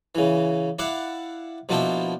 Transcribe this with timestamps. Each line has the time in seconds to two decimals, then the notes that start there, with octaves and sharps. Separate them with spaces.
0.15 C#3 E3
0.79 E4 D5 F5 F#5
1.69 B2 F3 A#3 D4 E4 G5